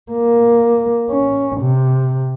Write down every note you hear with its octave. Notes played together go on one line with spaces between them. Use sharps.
A#3
C#4
C3